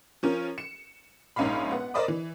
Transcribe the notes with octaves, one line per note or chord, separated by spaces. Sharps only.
F3 C#4 A#4
C#7 E7
A#1 G#2 C#4 D#4 F5 B5
B3 F#5
A#4 C5 D5 D#5 B5 D6
E3